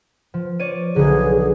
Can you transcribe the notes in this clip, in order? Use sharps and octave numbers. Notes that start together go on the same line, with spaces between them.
F3
C#5 D5 D#7
B1 D3 G#4